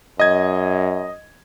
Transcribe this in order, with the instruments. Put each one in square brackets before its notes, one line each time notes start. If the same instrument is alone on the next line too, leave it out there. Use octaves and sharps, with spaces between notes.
[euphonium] F#2 [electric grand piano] D#5 G#6